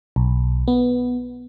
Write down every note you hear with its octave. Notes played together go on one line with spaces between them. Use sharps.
B1
B3